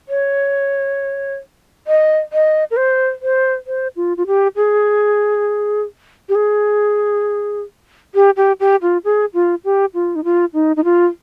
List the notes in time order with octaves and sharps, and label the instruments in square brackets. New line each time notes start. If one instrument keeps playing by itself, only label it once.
[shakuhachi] C#5
D#5
D#5
A#4
C5
C5
C5
F4
F4
G4
G#4
G4
G#4
G4
G4
G4
F4
G#4
F4
G4
F4
D#4
F4
D#4
D#4
F4